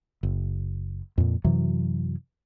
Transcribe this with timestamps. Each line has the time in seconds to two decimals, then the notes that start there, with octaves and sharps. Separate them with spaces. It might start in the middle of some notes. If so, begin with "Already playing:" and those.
0.23 F#1
1.18 F2 A#2
1.44 F#2 C3 E3 F#3